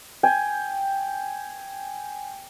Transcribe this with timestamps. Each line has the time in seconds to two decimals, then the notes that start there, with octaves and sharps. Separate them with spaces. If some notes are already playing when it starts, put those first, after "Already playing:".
0.23 G5 G#5